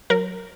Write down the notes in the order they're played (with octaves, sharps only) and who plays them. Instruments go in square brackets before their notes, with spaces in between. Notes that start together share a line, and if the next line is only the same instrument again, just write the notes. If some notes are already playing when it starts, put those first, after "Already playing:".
[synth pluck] F#3 A#4